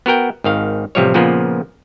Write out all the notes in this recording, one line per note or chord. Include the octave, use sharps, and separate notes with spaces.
B3 F#4 A#4 G5
G#1 D#3 F5
A1 C3 F3 G3 C#5
A#2 C#3 F3 A#3 B3